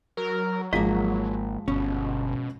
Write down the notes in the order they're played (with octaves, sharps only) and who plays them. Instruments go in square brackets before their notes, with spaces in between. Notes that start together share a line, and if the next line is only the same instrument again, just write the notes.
[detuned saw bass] F#3 [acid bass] A#4
[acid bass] G#1 [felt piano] F3 G#3 B6 [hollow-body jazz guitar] A#3 D#5
[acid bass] G1 [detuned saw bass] B2 [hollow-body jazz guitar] C#4